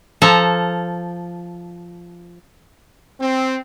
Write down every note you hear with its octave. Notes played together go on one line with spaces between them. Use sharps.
F3 A4 A#5
C4